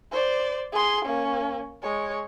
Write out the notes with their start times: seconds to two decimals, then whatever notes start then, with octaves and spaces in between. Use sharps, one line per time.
0.12 C5 D5
0.73 G#4 C6
1.05 A#3 C#4
1.82 G#3 C#5